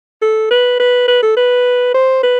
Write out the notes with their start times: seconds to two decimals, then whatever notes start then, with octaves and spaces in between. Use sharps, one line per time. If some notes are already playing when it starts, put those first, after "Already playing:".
0.22 A4
0.51 B4
0.80 B4
1.08 B4
1.22 A4
1.37 B4
1.94 C5
2.23 B4